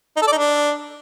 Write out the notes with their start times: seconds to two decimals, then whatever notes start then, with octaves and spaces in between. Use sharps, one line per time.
0.16 D#4
0.22 A4
0.27 D5
0.32 D#4
0.37 D4